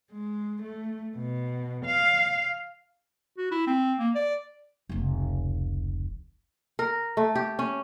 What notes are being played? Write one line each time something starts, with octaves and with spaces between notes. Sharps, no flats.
G#3
A3
B2
F5
F#4
E4
C4
A#3
D5
F1 C#2
A#4
A3
G4
C#4